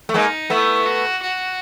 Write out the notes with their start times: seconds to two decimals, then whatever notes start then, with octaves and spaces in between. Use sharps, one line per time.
0.09 A3
0.14 G#3 A#3 D#4
0.50 A3 B3 E4
0.85 F#4
1.22 F#4